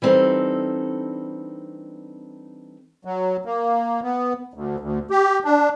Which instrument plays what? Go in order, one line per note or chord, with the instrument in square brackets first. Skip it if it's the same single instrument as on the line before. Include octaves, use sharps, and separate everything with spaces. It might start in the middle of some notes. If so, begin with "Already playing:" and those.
[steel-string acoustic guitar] E3 G3 C4 D4 D#4 A4
[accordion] F#3
A#3
B3
D2
D2
G4
D4